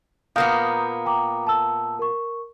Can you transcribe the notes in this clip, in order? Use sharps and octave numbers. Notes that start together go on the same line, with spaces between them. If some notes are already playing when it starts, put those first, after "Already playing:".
A#2 A#3 B3 F5 D#6 G6
G5 A#5 D6
A5 E6
A#4 C#6